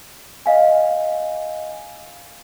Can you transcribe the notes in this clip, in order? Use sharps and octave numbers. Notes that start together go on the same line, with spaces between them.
D#5 F5 G#5